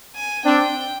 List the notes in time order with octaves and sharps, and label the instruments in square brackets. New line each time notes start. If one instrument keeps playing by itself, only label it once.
[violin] G#5
[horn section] C4 D4 [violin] G5